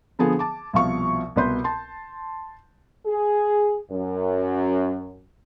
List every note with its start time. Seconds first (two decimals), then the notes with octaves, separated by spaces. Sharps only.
0.19 D3 F3 B3 G#4
0.39 A5 D6
0.73 C2 B2 F3 F5 C#6
1.36 C2 B2 B4 C6 G6
1.64 A5 C6
3.07 G#4
3.91 F#2